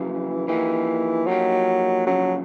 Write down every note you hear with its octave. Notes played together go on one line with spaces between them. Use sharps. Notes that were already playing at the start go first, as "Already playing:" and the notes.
Already playing: F2 C#3 E3 F#3
E3 F3 A#3 D#4 G4
F3 F#3 A#3 D#4 G4
F#2 C#3 F3 F#3